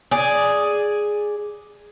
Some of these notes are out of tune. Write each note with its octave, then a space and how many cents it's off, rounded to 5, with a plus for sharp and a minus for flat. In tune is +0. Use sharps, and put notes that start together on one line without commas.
G#4 +0 D5 +0